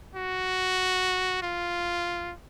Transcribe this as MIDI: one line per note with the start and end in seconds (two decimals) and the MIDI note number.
0.15 1.40 66
1.42 2.33 65